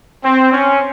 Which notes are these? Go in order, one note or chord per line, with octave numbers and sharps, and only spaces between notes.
C4
C#4